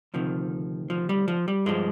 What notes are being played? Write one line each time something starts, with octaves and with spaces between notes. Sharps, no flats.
D2 C3 D#3 F3
F3
G3
F3
G3
G2 F3 G#3